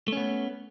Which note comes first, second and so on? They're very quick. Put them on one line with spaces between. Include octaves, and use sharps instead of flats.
A3 C#4 B3